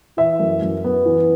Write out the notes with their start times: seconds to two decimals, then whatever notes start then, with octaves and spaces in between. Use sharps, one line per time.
0.17 E3 E5
0.40 F#2
0.62 F#2
0.84 B3
1.05 E3